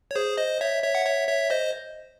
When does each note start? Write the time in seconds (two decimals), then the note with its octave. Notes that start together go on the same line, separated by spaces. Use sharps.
0.11 C#5
0.15 G#4 C5
0.37 C5 D#5
0.61 C#5 E5
0.83 C#5 E5
0.95 F#5
1.05 C#5 E5
1.28 C#5 E5
1.50 C5 D#5